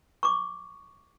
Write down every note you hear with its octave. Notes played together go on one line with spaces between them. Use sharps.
C#6 D6